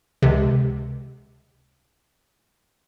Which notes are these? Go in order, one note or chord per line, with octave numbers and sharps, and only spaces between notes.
C#2 C3